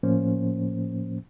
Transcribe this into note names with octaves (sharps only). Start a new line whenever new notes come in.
A2 F3 A#3 C#4 C5